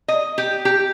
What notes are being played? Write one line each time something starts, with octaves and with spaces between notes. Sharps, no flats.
D#5
G4
G4